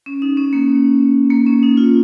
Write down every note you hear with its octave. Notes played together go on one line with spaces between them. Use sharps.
C#4
D#4
C#4
A#3
A#3
C#4
D#4
F4